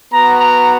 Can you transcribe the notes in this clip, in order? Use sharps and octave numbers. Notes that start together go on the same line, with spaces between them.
B3 F#4 A#5
A#5